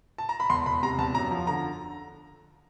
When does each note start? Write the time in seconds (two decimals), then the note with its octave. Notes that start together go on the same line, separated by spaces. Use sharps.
0.18 A5
0.29 A#5
0.40 B5
0.50 E2 C6
0.66 E1 B5
0.83 C3 A#5
0.98 E2 A5
1.15 F#2 A#5
1.31 F3
1.47 D3 A#5